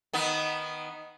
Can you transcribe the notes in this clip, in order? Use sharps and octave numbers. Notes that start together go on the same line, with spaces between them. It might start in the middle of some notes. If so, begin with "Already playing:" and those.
D#3 B3